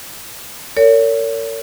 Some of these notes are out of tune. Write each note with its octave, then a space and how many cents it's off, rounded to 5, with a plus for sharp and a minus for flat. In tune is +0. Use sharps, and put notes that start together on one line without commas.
A#4 -40 C#5 +35